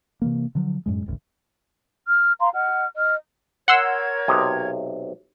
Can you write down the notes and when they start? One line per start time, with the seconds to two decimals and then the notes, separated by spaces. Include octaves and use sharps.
0.22 C3 E3 A#3
0.55 D3 F3 F#3
0.86 F#2 A2 G#3
1.06 E1 A1 D2
2.06 F6
2.40 F5 A#5 C6
2.53 D#5 F#5 F6
2.97 D#5 F6
3.68 A#4 C#5 F#5 C6 E6 G#6
4.28 B1 C3 D#5